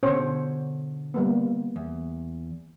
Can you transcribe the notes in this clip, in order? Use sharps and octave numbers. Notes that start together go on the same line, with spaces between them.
B2 D3 C#4 C5 C#5
G3 A#3 B3
E2